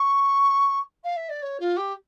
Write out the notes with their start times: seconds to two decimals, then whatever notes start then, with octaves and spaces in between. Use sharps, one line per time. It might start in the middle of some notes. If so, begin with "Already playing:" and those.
Already playing: C#6
1.03 F5
1.16 E5
1.29 D5
1.42 C#5
1.59 F4
1.76 G4